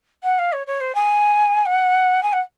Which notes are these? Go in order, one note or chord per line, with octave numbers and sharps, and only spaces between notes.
F#5
F5
C#5
C#5
C5
G#5
F#5
G#5
F#5